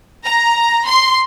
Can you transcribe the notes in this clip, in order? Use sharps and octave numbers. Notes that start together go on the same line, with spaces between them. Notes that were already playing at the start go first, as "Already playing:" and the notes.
A#5
C6